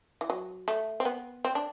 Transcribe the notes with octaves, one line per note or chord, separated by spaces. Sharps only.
E3
F#3
A3
C4
B3
C4
D4